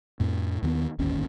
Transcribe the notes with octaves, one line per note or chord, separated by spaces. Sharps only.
F2 A2
D#2 D#3 B3
D1 G1 D#2 C#4